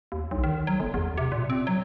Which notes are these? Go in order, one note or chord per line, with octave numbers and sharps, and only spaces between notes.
D#2
B1
D#3
F#3
G1
E2
C3
A#2
C4
F#3